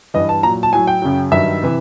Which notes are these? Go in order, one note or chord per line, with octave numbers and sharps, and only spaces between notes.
G2 E3 D#5
A5
A#2 F#3 A#5
A5
A2 F#3 G#5
G5
F#2 C#3 F#3
G2 D#3 F#3 E5
C3 E3